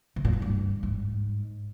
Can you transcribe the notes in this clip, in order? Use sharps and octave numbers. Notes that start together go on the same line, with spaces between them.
C3
A#2
G#2
G2
G#2